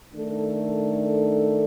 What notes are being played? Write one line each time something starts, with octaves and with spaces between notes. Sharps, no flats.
D#3 A3 D4 A4